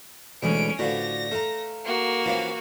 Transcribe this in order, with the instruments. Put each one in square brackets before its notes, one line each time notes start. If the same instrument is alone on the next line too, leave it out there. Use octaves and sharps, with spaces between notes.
[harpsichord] D2 [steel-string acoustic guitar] B2 E3 G#3 [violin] C#4 D7
[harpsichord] A2 D3 F3 [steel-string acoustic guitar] F#4 B4 D5 [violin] A#6
[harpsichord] A3 [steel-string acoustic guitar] F5 A#5
[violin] A#3 F#4
[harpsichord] E3 F3 C#4 [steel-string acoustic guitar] F5